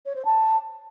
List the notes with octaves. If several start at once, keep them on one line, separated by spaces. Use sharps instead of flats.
C#5
C5
A5